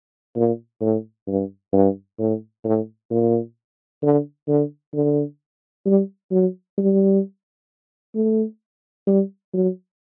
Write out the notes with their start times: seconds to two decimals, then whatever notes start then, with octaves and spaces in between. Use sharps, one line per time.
0.36 A#2
0.81 A2
1.27 G2
1.73 G2
2.19 A2
2.64 A2
3.11 A#2
4.03 D3
4.48 D3
4.94 D3
5.86 G3
6.31 F#3
6.78 G3
8.15 A3
9.07 G3
9.53 F#3